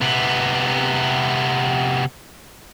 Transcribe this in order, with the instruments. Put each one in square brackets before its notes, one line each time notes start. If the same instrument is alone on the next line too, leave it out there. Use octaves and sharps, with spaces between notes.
[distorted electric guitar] C3 B3